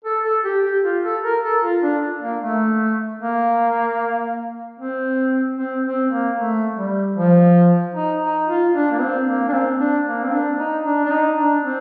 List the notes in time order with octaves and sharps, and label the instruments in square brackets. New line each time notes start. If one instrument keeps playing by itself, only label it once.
[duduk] A4
A4
G4
G4
F4
A4
A#4
A4
F4
D4
A#3
A3
A#3
C4
C4
C4
A#3
A3
G3
F3
D#4
D#4
F4
D4
A#3
C4
A#3
D4
C4
D4
A#3
C4
D4
D#4
D4
D4
D#4
D4
C4